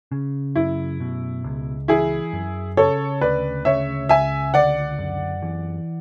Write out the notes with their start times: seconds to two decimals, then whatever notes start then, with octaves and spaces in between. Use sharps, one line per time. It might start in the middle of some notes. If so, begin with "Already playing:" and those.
0.12 C#3
0.56 F#2 E4
1.00 B2
1.44 C#2
1.88 E3 E4 G#4
2.33 F#2
2.77 C#3 A4 C#5
3.21 D2 B4 D5
3.65 C#3 C#5 E5
4.09 C#2 E5 G#5
4.54 D3 D5 F#5
4.98 F#2
5.42 E3